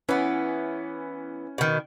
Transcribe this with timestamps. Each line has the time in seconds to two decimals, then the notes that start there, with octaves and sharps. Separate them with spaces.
0.09 E3 B3 C#4 E4 B4
1.58 B2 D#3